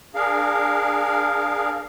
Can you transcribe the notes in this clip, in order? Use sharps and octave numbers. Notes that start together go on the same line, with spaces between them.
D4 G#4 A#4 F5